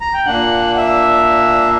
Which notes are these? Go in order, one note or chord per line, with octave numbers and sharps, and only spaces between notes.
A#5
G5
A#2 A#3 D4 F#5
E5